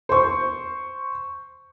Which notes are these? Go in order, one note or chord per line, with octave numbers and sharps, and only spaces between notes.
C5 C#6